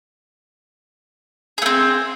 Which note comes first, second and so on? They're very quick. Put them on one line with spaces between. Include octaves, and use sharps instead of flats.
G#4 A3 C4